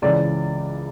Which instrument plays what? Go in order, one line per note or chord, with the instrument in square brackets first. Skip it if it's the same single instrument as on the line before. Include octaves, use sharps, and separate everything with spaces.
[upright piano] C#2 C#3 E3 D5